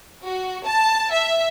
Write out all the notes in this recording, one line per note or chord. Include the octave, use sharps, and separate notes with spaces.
F#4
A5
E5